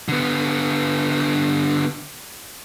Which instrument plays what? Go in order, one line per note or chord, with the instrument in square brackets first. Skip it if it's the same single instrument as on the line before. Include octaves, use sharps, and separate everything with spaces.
[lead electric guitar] D3 B3